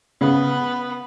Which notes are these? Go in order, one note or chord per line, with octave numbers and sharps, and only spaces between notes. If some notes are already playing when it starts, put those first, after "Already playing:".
C#3 B3